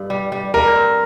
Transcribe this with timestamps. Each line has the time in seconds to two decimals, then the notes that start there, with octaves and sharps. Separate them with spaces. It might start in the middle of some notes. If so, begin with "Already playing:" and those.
Already playing: G2
0.10 G3
0.32 G3
0.54 G3 A#4
0.76 C4